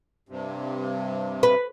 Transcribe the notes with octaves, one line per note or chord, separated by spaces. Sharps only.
G2 C3
B4